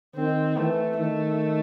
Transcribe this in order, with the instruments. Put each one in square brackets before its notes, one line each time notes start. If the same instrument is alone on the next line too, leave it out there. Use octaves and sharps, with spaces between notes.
[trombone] D#3 [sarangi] C4
[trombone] E3 [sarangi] A3
[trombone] D#3 [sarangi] A3